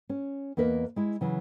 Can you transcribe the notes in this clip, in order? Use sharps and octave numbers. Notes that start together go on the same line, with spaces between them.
C#4
E2 A#3 A#4 B4 D#5
G#3 E4
C#3 E3 F#3